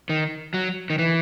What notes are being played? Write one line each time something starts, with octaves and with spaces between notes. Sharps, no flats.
D#3
F#3
D#3
E3